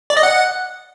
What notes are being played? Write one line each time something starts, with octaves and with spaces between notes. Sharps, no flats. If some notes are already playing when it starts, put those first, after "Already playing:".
D5
D#5
F#5